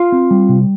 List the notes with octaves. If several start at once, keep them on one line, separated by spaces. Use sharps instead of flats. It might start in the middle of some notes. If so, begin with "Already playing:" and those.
Already playing: F4 F5
C4
G3
C3